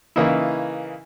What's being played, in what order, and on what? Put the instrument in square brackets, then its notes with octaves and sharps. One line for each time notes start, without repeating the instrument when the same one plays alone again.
[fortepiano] C#3 E3 A#3 D#4 E4